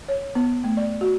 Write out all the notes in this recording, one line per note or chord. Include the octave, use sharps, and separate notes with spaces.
C#5
B3
A3
D5
F#4